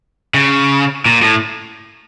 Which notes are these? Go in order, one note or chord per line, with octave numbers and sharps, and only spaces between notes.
C#3
A#2
A2